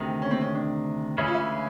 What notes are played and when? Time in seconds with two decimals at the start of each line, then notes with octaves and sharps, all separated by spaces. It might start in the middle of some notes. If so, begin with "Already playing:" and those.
Already playing: D2 C3 D#3
0.22 C#4
0.31 C4
0.41 C#4
0.55 D4
1.18 D2 C#3 E3 G#3 C#4 E4
1.27 F4
1.34 E4